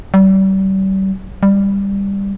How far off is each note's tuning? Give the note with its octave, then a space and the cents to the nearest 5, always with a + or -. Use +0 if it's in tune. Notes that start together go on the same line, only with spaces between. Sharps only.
G3 -35
G3 +15